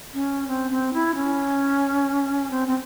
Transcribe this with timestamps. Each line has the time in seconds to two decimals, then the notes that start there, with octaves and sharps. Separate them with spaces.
0.14 C#4
0.48 C4
0.71 C4
0.94 E4
1.15 C#4
2.51 C4
2.68 C4